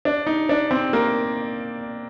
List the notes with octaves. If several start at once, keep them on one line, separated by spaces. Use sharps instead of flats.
D4
D#4
D4
C4
A#3